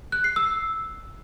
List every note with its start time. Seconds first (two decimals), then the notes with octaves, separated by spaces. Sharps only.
0.12 F#6
0.24 C7
0.36 E6